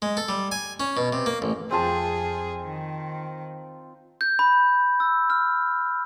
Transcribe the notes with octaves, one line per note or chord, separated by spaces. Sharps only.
G#3
A4
G3
G#5
C#4
B2
C3
A#3
A1
F2 C4 F4 G#4 A5
D#3
G6
B5
E6
F6